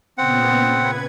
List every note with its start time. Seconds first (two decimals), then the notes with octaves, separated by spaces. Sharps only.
0.18 A#2 C#3 B3 C4 F#5
0.69 B4 G#6